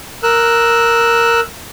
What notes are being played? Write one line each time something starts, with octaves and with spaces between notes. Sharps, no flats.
A#4 E6 F#6